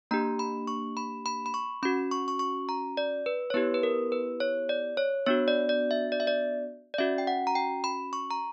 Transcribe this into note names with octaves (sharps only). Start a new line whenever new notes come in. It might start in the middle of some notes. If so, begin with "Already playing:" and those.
A#3 D4 G4 A#5
B5
C#6
B5
B5
B5
C#6
C#4 F#4 B5
C#6
C#6
C#6
A#5
D5
B4
C#5
B3 E4 G4 B4
B4
A#4
B4
C#5
D5
C#5
B3 D4 F#4 C#5
D5
D5
E5
D5
E5
D5
D5
C#4 F#4 E5
G5
F#5
A#5
G5
B5
C#6
A#5